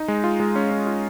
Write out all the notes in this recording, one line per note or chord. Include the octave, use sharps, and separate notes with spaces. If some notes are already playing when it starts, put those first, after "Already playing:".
Already playing: D#4
G#3
F4
G#3
C#4
C#4
F4